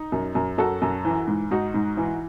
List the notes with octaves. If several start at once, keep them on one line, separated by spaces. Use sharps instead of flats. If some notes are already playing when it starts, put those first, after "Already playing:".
Already playing: D#4
F#2
F#2
F#2 F#4 A4
F#2
E3
G#2
G#2 D#4 F#4
G#2
E3